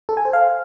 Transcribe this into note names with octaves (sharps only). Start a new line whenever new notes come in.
A4
G#5
C5
F5